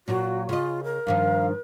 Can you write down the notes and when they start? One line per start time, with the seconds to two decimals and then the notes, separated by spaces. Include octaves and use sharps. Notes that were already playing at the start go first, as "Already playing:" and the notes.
0.08 A#2 F#3 F4 F#4
0.49 C#3 F4 D#5
0.84 A#4
1.07 G2 D#3 F3 F5